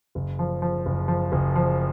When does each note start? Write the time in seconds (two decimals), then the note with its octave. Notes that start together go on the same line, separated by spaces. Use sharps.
0.15 F#1
0.39 F3
0.62 F3
0.86 F#1
1.08 F3
1.32 F#1
1.56 F3